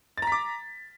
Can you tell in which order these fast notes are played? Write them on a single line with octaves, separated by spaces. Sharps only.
A6 A#5 B6 D6